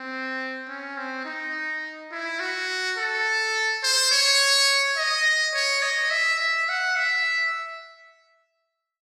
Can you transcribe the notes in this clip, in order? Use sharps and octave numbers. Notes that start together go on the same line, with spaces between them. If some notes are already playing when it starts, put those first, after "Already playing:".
Already playing: C4
C#4
C4
D#4
E4
F#4
A4
C5
C#5
D#5
C#5
D#5
E5
E5
F#5
E5